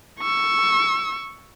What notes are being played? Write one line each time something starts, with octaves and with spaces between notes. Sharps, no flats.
C#6 E6